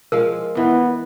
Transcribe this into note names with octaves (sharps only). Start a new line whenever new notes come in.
F3 G#3 A#4 F5
E3 B3